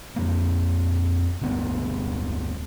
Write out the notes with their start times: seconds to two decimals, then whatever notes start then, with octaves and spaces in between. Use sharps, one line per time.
0.16 F2 A#3
1.41 D1 G1 D2 B3